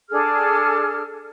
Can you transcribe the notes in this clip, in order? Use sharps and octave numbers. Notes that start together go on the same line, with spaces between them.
D4 G#4 A4 F6